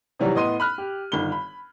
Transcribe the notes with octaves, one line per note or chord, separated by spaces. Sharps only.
C3 D#3 E3 F#3 G3
A2 B3 D#5 C6 D#7
B5 F6 F#6
G4
G1 D#3 B5 G7
B5